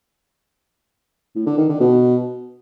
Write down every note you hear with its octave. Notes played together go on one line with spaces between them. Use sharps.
A2
D3
D#3
D3
B2